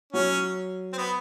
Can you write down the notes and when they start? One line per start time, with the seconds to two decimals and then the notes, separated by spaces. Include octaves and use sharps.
0.13 F#3 C#4
0.93 C4
0.98 B3